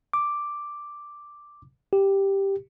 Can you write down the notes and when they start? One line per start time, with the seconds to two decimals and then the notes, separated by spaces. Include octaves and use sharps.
0.13 D6
1.93 G4